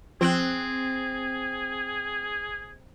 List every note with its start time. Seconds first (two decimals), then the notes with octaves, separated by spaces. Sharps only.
0.21 F3 C4 G#4 G5 F#6